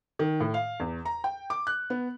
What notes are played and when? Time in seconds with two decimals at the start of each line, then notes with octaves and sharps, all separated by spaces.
0.19 D#3
0.40 A2
0.54 F5
0.80 E2
1.05 A#5
1.24 G5
1.50 D6
1.67 F#6
1.90 B3